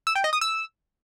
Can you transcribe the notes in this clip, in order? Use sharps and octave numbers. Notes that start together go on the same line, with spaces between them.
E6
G5
D#5
D#6
E6